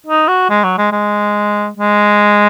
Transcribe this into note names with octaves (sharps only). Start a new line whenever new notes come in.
D#4
F#4
G#3
F#3
G#3
G#3
G#3